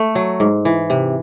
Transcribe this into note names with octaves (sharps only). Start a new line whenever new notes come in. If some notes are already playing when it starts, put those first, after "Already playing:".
Already playing: A3
F#3
G#2
E3
C3